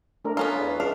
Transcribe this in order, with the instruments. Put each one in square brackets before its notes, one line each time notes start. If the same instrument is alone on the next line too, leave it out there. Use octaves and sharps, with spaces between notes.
[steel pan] A3 D4 A#4
[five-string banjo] B3 C#4 F4 [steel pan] A#4
[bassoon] E2
[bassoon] C#2 [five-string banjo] D4 F5